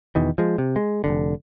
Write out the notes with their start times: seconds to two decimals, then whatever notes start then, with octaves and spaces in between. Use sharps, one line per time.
0.15 E2 B2 D#3 E3
0.38 F3 G#3
0.58 C3
0.76 G#3
1.04 F1 B1 D3